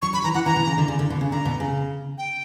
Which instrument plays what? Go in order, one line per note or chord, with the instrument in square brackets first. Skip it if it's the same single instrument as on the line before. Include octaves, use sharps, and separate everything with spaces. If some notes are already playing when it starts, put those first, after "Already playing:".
[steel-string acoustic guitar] F#3 [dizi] C#6
[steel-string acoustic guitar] F#3 [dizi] B5
[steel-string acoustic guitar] E3 [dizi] A#5
[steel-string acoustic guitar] E3 [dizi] F#5
[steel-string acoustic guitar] E3 [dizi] A#5
[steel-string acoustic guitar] B2
C#3
D3
C#3
D3
B2
C#3
[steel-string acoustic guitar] D3 [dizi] A#5
[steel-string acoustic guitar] B2
C#3
[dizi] G5